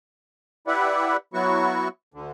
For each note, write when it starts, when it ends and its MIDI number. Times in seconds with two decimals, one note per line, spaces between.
0.67 1.17 64
0.67 1.17 67
0.67 1.17 71
0.67 1.17 74
0.67 1.17 76
0.67 1.17 78
1.34 1.88 54
1.34 1.88 59
1.34 1.88 64
1.34 1.88 66
1.34 1.88 85
2.14 2.32 38
2.14 2.32 50